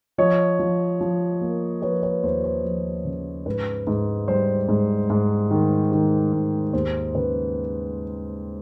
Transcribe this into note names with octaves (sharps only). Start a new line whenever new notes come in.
F3 C#5 D#5
F3
F3
A#3
F3 B4 C#5
B4 C#5
D#2 C5
C5
F3
C#3
G#2 B4
G#2
G3 C5
G#2
G#2
D#3
D#3
G#2
D#2 C5
C#3 B4